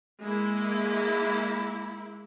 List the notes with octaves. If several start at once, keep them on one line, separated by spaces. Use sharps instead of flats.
G#3 A#3 E4